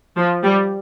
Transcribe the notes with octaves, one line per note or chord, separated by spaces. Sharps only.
F3
G3